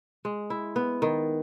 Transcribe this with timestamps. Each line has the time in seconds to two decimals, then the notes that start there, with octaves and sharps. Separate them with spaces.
0.25 G#3
0.50 E4
0.76 B3
1.02 D#3